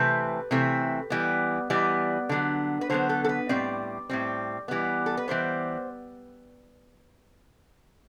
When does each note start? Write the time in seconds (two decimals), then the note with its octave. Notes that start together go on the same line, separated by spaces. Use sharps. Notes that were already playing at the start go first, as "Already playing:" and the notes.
Already playing: C3 E3 A3 C4 B4
0.51 C3 E3 A3 C4
1.10 E3 G3 B3
1.70 E3 G3 B3 D5
2.29 D3 F#3 B3
2.81 B4
2.90 D3 F#3 B3 C5
3.09 A4
3.24 A4
3.29 B4
3.49 A2 G3 C4 D5
4.09 A2 G3 C4
4.68 E3 G3 B3
5.06 A4
5.17 B4
5.28 E3 G3 B3 C5